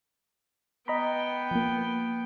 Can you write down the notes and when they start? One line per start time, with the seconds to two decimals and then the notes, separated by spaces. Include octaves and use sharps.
0.88 B3 D#5 G5 A#5 B5
1.51 F3 A#3